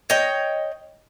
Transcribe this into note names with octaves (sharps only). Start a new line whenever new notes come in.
C#5 D#5 G5